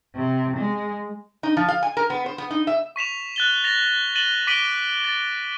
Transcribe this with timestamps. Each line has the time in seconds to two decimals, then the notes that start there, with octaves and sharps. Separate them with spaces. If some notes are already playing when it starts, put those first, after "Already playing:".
0.15 C3
0.56 G#3
1.43 D#4
1.57 F3
1.68 F5
1.83 G#5
1.97 A#4
2.10 B3
2.26 C5
2.38 B3
2.51 D#4
2.67 E5
2.96 C#6 B6 E7 F7
3.36 F#6 A6 G7
3.64 A6 A#6 F7
4.15 A6 D#7 E7 F#7 G7
4.47 D6 B6 D7 D#7 F#7 G7
5.04 A6